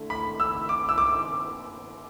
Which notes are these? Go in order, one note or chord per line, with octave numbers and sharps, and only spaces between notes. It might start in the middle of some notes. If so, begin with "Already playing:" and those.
Already playing: D3 A3 E4
B5
E6
D6
E6
D6